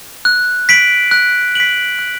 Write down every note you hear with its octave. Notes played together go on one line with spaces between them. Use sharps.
F#6
B6 D7 F#7
F#6
B6 D7 F#7
F#6